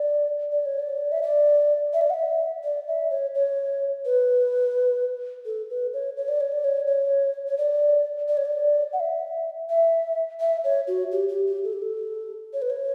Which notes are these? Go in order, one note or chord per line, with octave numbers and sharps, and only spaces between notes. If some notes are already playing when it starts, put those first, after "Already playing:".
Already playing: D5
D5
C#5
D5
E5
D5
E5
D5
F#5
E5
D5
E5
C#5
C#5
B4
A4
B4
C#5
C#5
D5
C#5
D5
C#5
C#5
C#5
D5
D5
C#5
D5
F#5
E5
E5
E5
C#5
F#4
G4
G4
G4
A4
G4
A4
C#5
B4
C#5